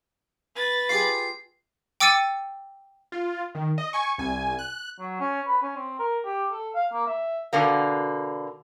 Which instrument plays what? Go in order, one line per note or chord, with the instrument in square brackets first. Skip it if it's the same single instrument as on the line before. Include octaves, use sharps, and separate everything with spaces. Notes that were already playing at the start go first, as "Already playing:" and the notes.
[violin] B4 A6
[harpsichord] F4 G4 G#4 [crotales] C7
[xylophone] G5 D6 E6 A6 C#7 D#7
[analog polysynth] F4
D#3
D#5
G#5 C#6
C2 G#5
F#6
[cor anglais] F#3
C#4
B4
C#4
C4
A#4
G4
A4
F5
A#3
E5
[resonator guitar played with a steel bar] B2 D3 A#3